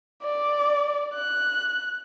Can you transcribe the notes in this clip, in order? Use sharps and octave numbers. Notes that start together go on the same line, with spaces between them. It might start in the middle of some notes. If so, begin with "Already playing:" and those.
D5
F#6